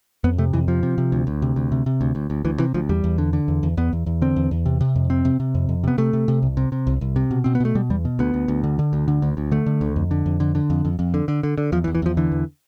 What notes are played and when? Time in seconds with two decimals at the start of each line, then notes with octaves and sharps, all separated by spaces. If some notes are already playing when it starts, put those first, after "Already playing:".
0.24 F2 B3
0.38 C3 A3
0.53 F2 E3
0.68 C3 F3
0.83 C3
0.98 C3
1.12 D2
1.27 D2
1.42 C3
1.56 D2
1.72 C3
1.86 C3
2.01 D2
2.15 D2
2.30 D2
2.45 D2 E3
2.59 C3 E3
2.74 D2 F3
2.89 E2 G3
3.04 E2
3.18 D3
3.33 D3
3.48 E2
3.63 E2
3.77 E2 B3
3.93 E2
4.06 E2
4.22 D3 C4
4.36 E2
4.51 E2
4.66 C3
4.81 C3
4.95 F2
5.10 C3 C4
5.25 C3
5.40 C3
5.55 F2
5.69 F2
5.84 C3 B3
5.98 C3 A3
6.13 C3
6.28 C3
6.43 C2
6.57 C3
6.72 C3
6.87 C2
7.01 C2
7.16 C3
7.31 B2
7.44 B2 C4
7.55 B3
7.60 B2 A3
7.75 B2 G3
7.90 E2 G3
8.05 B2
8.19 D2 B3
8.34 D2
8.48 D2
8.64 D3
8.79 D3
8.93 D2
9.08 D3
9.22 D2
9.37 D2
9.51 D3 A3
9.66 D3
9.81 D2
9.96 F2
10.11 D3
10.26 F2
10.40 D3
10.55 D3
10.70 F2
10.85 F2
10.99 F2
11.14 D3
11.28 D3
11.43 D3
11.58 D3
11.72 E2 F3
11.84 E3
11.87 E2
11.95 E3
12.02 E2 F3
12.17 D3 E3
12.32 E2